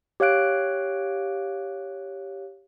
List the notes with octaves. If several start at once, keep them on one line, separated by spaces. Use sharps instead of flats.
G4 C#5 F5 F#6 D7